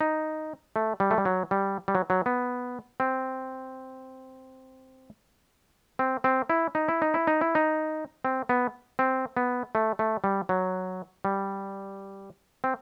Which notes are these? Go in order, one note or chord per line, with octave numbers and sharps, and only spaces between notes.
D#4
A3
G3
A3
G3
F#3
G3
G3
F#3
F#3
B3
C4
C4
C4
E4
D#4
E4
D#4
E4
D#4
E4
D#4
C4
B3
C4
B3
A3
A3
G3
F#3
G3
C4